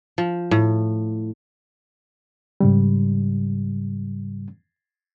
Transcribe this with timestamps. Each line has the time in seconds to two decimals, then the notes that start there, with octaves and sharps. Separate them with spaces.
0.18 F3
0.51 A2
2.60 G#2 C#3 G3